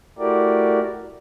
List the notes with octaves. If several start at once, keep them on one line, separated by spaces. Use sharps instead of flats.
A3 E4 F#4 G4 A#4 D5